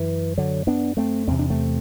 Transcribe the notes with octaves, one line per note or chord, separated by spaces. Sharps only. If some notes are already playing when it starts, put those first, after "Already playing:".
Already playing: F#2 E3
D3 F#3
B3 D4
A3 C4
E2 C3 C4
D4
A3 C4